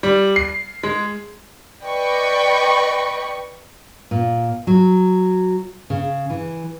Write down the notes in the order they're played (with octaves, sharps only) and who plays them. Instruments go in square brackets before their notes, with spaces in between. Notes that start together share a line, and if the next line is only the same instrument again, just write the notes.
[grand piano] G3
C7
G#3
[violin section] B4 D5 D#5 G5 B5 C#6
[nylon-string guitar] A#2
F#3
C#3
E3